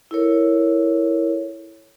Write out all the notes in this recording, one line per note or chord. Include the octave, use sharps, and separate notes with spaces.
E4 A4 A#4 C#5